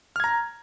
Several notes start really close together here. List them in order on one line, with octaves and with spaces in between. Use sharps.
F6 G#6 A#5